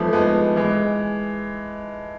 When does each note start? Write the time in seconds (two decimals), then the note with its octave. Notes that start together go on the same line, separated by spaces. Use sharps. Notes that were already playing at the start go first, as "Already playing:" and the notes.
Already playing: E3 F3 G#3 A3 B3
0.13 G#3 B3
0.56 E3 G#3